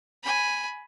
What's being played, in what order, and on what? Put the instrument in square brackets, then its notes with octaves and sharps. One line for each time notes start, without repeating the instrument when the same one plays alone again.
[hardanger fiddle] G#5 B5